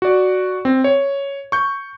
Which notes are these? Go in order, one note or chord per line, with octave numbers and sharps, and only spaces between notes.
F#4 D5
C4
C#5
C#6 G6